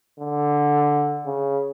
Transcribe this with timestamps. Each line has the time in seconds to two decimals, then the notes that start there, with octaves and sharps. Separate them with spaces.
0.20 D3
1.26 C#3